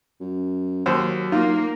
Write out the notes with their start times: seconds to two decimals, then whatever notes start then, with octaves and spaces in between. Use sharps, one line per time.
0.20 F#2
0.86 D#2 F#3 C5
1.32 A#3 D#4 F4